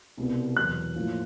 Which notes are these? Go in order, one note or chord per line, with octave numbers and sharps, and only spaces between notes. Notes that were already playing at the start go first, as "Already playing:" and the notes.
C2 B2 G3 B3
E2 B2 F#3 B3 F#6
A2 F3 A#3